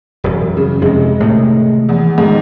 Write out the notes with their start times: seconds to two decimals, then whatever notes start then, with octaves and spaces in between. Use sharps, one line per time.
0.24 E1 F#2 G3
0.57 C#3
0.82 F2 C3 G#3
1.20 A2 C3 D#3
1.89 E2
2.18 G#2 D#3